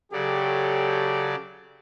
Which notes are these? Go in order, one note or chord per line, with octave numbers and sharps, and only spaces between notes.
C#3 F#3 G4 A4 D5